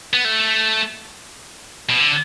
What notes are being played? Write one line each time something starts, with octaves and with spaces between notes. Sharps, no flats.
B3
A3
B2
D3